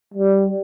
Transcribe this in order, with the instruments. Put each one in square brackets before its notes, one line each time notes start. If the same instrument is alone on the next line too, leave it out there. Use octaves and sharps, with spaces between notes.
[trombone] G3